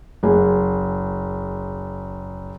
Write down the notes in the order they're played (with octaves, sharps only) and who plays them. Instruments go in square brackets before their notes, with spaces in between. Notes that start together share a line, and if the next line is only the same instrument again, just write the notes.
[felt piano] F#1 G#4